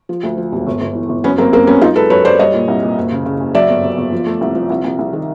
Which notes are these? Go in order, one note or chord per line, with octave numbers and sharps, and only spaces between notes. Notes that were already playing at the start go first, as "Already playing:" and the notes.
F3
D2
F3
E1
G1
G1
E3
G1
F#2 B3 C#4
F#2 A#3 C4
F#2 A#3 C4
F#2 B3 C#4
F#2 D#4 F4
G#3 A4 B4
F#2 B4 C#5
F#2 C5 D5
G3 C#5 D#5
A#2
C2
A#2
F#1
C#3
C#3
F#1
F#3 D5 E5
G1
G1
G1
F3
A3
C2
F3
C2
C2
C2
D#3